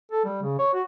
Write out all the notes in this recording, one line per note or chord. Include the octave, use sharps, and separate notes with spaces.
A4
G3
C#3
C#5
F#4